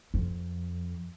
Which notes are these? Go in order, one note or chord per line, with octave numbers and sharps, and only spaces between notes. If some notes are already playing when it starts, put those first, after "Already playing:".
F2